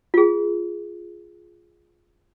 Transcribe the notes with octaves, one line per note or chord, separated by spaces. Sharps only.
F4 G#4